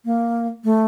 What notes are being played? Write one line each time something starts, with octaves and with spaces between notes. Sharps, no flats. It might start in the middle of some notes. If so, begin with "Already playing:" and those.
A#3
A3